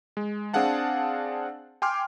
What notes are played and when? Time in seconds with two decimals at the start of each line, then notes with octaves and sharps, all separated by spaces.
0.17 G#3
0.54 C4 D4 G#4 F5 F#5 A5
1.82 G5 G#5 C6 D6 F6